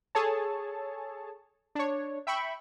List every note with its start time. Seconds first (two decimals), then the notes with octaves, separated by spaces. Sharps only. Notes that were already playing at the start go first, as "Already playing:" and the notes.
0.15 G#4 A4 C#5 A5
1.75 D4 C#5
2.27 E5 G5 B5 C#6